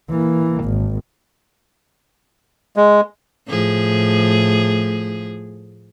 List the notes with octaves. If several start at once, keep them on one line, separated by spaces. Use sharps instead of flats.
E3 A#3
G#1
G#3
A2 F3 G#4